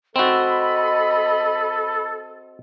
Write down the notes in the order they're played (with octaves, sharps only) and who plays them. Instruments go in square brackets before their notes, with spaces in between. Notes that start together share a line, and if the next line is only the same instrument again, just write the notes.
[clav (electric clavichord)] C4 F#4 [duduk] A4 [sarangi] D#5 [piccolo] B5